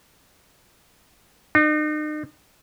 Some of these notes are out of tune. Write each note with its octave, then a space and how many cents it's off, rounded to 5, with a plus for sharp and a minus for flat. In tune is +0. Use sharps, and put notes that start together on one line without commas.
D#4 -40